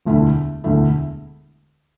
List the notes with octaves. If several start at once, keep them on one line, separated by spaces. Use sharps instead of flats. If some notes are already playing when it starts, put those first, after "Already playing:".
E1 D2 D3 A3 E4
E1 D2 D3 A3 E4